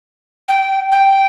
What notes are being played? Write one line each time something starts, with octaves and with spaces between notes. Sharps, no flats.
G5
G5